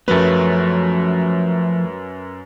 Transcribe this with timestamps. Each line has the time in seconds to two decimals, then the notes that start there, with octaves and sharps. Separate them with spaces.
0.08 F#2 F3 F#3 A3 A#4 B4